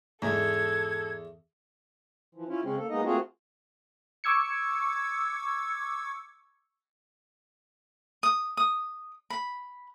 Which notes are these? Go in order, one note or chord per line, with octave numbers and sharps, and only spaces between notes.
E2 G#2 A4 G#6
E3 F3
C#4 E4 F4
C#3 G#3 C4 C#4
A#3 A4
G#3 A#3 B3 D#4 D#5
A3 A#3 C4 F4 F#4 G#4
C#6 D6 E6 G#6 C#7
D#6
D#6
B5